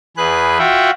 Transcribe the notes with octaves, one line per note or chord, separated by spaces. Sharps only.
E2 G#4 B4 F#6
F4 F#4 E5 F#5 G5